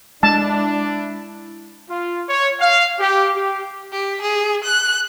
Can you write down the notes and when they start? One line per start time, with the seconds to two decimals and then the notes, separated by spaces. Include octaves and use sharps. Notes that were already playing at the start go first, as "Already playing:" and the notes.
0.23 G#3 D4 E4 A5
1.90 F4
2.29 C#5
2.60 F5
2.99 G4
3.34 G4
3.93 G4
4.22 G#4
4.64 F#6